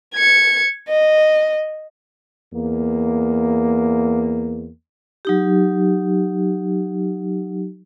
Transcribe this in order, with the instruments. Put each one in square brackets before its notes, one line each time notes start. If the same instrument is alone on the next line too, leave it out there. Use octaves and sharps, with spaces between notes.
[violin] G#6 C#7
D#5
[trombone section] E2 A#3
[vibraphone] F#3 D#4 G4